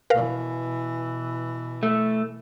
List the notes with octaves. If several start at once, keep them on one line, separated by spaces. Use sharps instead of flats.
B2 E3 A#4 B4 F5
A3